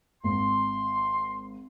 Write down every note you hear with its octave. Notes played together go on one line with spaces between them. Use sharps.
G#1 C6